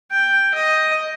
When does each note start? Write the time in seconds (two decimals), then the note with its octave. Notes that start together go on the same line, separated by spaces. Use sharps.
0.11 G5
0.55 D#5